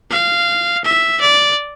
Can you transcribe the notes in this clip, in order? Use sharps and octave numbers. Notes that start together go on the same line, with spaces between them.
F5
E5
D5